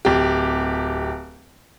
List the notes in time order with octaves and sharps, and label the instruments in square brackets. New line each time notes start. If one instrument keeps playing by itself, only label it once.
[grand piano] D1 G4